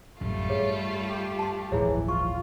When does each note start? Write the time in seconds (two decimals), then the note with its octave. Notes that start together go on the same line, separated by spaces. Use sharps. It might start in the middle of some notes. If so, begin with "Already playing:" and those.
0.21 A1 F#2 G3 A3 F4
0.50 G2 G#4 C#5
1.08 G4
1.39 A5 C6
1.72 D1 G1 E3 F3 E4 G#4 C#5
2.08 F4 C#6